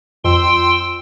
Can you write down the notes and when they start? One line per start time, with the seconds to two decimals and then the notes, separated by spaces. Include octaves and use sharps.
0.24 F2 G5 C6 E6